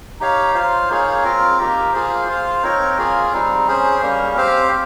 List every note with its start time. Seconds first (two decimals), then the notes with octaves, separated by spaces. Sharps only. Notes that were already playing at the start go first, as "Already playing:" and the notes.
0.20 D#4 G4 C#5 F5
0.54 F4 C5 F5
0.89 A#3 D#4 G#4 C#5
1.24 C4 F4 A#4
1.59 A#3 D#4 G4
1.93 A#3 F4 G#4 C5
2.28 F4 C5 F5
2.63 C4 D#4 A#4 C#5
2.98 A#3 F4 G#4
3.33 G3 C4 D#4
3.67 C#4 G#4 C5
4.02 G3 A#3 C#4
4.36 C4 G4 C5 F5